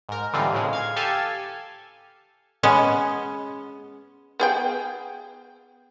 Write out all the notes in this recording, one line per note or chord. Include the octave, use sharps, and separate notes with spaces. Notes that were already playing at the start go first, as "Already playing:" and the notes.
G#2 A#4
D3 E3 G3 C4 D#4 F4
A2 C#3 G#3
F5 G#6
G4 A4 F5 G#5 A5
G#3 B3 C#4
B3 G#4 G5